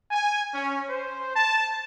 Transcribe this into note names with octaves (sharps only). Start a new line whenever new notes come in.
G#5
C#4
C5
A5